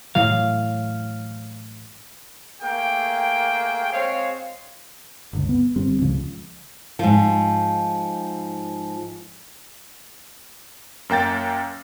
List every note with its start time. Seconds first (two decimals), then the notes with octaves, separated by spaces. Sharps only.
0.15 A2 E3 F#3 F5
2.61 A3 A#3 G#4 G5
3.93 G#3 C4 C5 C#5 F5
5.33 G1 C#2
5.49 B3
5.76 G1 G3 C4
6.02 C#2 C#3 F3 G#3
6.99 G#2 F3
11.09 F#2 A#3 G5 A6